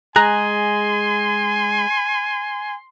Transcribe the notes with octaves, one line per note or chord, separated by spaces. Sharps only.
G#3 G#4 G#5 A#5 C6 F#6